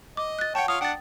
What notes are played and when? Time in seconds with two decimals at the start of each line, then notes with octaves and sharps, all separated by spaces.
0.17 D#5 D6
0.39 F#6 A6
0.55 C#5 F#5 G5 A5
0.68 F4 C#5 F5 D#6
0.81 D4 F#5 G5 A6